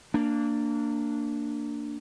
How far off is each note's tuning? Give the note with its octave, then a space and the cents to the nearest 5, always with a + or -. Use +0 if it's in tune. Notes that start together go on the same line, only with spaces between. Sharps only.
A#3 -20 D4 +0